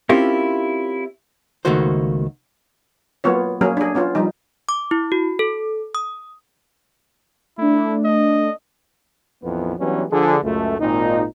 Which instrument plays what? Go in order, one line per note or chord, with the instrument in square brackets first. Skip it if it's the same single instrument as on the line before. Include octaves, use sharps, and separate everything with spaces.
[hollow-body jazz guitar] C4 C#4 E4 F4 G4 A#4
C#2 D#3 A3 A#3 F#4 C5
[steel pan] F#3 A#3 B3 F4 C#5
F#3 A#3 C#4 G#4
D4 G#4
B3 C#4 F4
F3 G3 D#4
[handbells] D6
E4
F#4
A4
D#6
[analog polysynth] A3 D4 [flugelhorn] E4
[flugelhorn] D#5
[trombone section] A#1 F2 E3 B3
E3 F#3 G3 B3 C#4 D4
D3 F3 G#4
C#2 F#2 A3
G#1 A#2 D#4